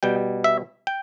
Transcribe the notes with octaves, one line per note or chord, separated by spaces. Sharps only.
B2 G3 G5
E5
G5